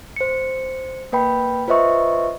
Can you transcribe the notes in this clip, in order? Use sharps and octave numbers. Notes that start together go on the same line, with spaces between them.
C5 C#7
A#3 B4 G5 B5
F4 B4 C5 D#5 E5 C#6